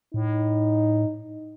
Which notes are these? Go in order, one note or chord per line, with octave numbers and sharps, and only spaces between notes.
A2 D#4